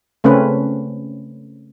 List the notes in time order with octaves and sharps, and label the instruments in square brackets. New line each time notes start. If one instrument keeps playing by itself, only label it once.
[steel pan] C#3 A3 C4 C#4 B4